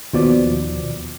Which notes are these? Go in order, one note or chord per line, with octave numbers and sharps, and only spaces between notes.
D#2 B2 F3 D5